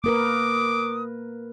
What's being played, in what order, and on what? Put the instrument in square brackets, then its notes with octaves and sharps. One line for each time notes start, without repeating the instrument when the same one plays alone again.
[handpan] A#3 A#4 B4 [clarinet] D6 [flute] D#6